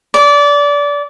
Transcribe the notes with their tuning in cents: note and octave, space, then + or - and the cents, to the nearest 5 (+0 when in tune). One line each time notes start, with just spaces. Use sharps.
D5 -25